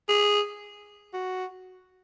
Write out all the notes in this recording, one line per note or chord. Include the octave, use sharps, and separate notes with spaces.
G#4
F#4